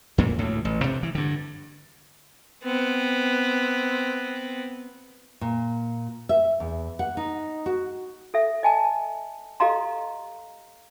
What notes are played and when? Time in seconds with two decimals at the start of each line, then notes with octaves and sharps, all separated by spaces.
0.18 F2 A#2 A#3
0.38 D2 A2
0.65 A1
0.81 G2 C3
1.03 E3
1.15 G2 D3
2.64 B3 C4
5.41 A#2
6.29 E5
6.60 E2
6.99 F#5
7.17 D#4
7.66 F#4
8.34 A4 E5
8.63 D#5 G#5 A5
9.60 G4 A4 D#5 F5 A#5 C6